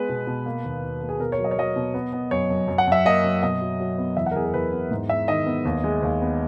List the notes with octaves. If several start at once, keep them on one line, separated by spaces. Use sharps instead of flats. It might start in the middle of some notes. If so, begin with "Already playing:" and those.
Already playing: G#3 B3 B4
B2
B2
A#3
D#2
D#2
A#3
G#4
B2 A#4
C#5
F#3
D#5
C#5
F#3 D#5
B2
B3
B3
F#2 C#5
F#2
F#2
F#5
F#2 E5
A#3 D#5
F#2
B2 D#5
F#3
F#3
B3
E2 E5
F#5
A#4
E2 G#4
A#4
E2 B4
B3
G#2
G#3 E5
D#3 D#5
B3
D#2
G#3
D#2
B3